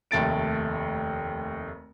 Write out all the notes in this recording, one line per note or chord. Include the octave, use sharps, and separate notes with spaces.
F1 D#2 A3 A6 D7